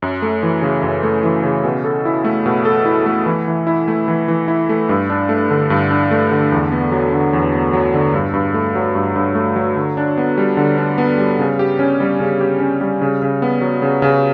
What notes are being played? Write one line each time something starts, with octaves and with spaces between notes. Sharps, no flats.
F#2
A3
E3
C#3
F#2
A3
E3
C#3
B2
A4
E4
A3
B2
A4
E4
A3
E3
E3
E4
A3
E3
E3
E4
A3
G2
D4
A3
D3
G2
D4
A3
D3
E2
B3
F#3
D3
E2
B3
F#3
D3
G2
G2
A3
F#3
G2
G2
A3
F#3
D3
D4
B3
G3
D3
D4
B3
G3
C#3
G4
C#4
G3
C#3
G4
C#4
G3
C#3
C#3
B3
F#3
C#3
C#3